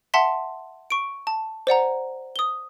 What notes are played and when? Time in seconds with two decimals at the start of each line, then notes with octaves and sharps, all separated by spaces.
0.14 E5 F#5 A5 C6 B6
0.90 C#6 D7
1.27 A5
1.67 C5 D5 F#5 A#5
2.36 D#6 G7